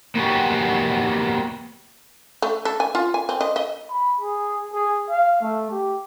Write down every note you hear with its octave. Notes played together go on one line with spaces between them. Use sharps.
A#3 B3 F#4 G4 G#5
A3
A4
G#5
F4
G#5
C4
D#5
D#5
B5
G#4
G#4
F5
A3
G4